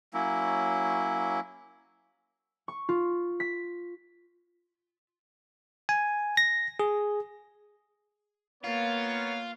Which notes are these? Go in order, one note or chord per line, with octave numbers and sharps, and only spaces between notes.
F#3 A#3 C#4 E4
C#6
F4
B6
G#5
A#6
G#4
A#3 B3 F4 A#4 C#5 F5 A6